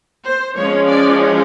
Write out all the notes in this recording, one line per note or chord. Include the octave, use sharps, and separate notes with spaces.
C5
F3 G#3 C#4 C#5
D5